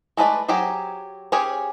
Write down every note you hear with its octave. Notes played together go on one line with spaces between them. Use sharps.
G#3 A3 B4 C5 D5
F#3 G4 G#4 C5
C#4 G4 G#4 C5 C#5